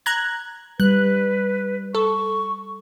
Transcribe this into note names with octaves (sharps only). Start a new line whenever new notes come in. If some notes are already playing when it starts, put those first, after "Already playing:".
A#5 F#6 G#6
G3 B4 F#6
A4 C#6